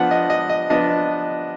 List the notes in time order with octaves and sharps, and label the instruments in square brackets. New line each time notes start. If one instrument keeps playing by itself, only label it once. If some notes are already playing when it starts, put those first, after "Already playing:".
Already playing: [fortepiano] F3 B3 D4 F#5
D#5
D#5
D#5
F3 B3 D4 D#5